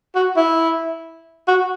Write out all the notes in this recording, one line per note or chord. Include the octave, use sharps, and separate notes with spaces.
F#4
E4
F#4